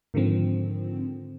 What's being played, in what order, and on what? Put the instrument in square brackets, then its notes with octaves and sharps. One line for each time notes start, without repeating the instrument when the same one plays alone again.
[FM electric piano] G#2 D3 D#3 F3 C4